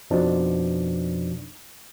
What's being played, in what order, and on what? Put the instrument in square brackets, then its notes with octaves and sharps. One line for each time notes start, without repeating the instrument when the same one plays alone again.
[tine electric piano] F2 B2 F3 D4 D#4